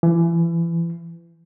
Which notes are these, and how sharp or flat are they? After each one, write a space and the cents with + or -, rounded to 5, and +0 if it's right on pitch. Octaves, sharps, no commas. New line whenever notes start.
E3 +30